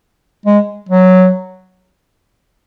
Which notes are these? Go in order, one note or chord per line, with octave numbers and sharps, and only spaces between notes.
G#3
F#3